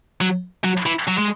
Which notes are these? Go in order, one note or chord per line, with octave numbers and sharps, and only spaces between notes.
F#3
F#3
E3
F#3
G#3